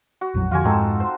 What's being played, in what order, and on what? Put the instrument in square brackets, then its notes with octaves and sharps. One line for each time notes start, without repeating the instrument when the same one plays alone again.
[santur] F#4
[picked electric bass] A#1 F2 F#3
[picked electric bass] F2 D3 [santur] F4 F#4 G#5
[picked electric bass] F2 G#2 G#3 [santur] C4 D#4 A4
[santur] C5